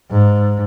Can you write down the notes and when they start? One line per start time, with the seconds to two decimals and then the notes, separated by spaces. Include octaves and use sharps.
0.11 G#2